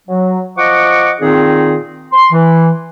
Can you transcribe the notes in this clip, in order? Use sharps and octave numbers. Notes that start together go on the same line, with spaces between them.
F#3
F3 D#5 F#5 C#6 D6
A#2 D#3 C4 D#4 F4 G#4
C6
E3